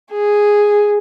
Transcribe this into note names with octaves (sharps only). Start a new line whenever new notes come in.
G#4